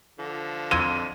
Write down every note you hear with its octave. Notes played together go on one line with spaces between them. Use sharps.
D3 F3
F2 C6 E6 G#6 D#7